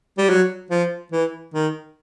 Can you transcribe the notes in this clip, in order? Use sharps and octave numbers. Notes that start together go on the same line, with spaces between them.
G3
F#3
F3
E3
D#3